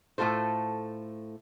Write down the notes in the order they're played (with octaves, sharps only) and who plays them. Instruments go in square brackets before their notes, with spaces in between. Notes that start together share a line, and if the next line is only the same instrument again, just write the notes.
[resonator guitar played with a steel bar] A2 A3 F4 A4 C5